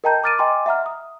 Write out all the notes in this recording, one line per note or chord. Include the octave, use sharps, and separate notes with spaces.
A#4 D#5 G5 A5 A#5 G6
D6 F6 A6 D7 D#7
D#5 G5 G#5 A#5 C6 D6
E5 F#5 A#5 F6
D#6